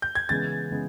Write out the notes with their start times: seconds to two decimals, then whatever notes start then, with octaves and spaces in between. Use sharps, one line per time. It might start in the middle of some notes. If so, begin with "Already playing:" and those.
0.02 G6
0.15 G#6
0.29 C#3 E3 G#3 B3 A6
0.71 C#3 E3 G#3 B3